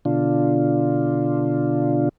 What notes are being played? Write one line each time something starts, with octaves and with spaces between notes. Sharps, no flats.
B2 D3 D4 F4